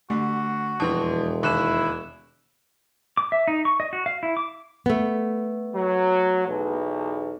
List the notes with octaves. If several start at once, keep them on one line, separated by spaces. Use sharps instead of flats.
D3 A3 F#4
E1 F2 E3 A5 C6
D#2 E4 C#6 F#6 E7
D6
E5
D#4
C#6
D#5
F#4
F5
E4
D6
A3 B3
F#3
B1 E2